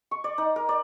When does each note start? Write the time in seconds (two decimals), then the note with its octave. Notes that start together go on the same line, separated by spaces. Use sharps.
0.11 C#6
0.24 D5
0.38 D#4
0.56 A#4
0.69 D5